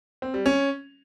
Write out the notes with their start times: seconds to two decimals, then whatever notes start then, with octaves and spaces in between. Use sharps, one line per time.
0.22 C4
0.34 G3
0.46 C#4